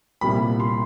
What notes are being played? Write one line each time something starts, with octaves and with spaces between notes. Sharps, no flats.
C2 A#2 G3 A#3 B5
C6